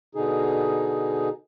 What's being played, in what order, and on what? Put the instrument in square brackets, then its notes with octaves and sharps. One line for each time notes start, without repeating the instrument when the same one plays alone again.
[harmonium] B2 D3 D#4 G#4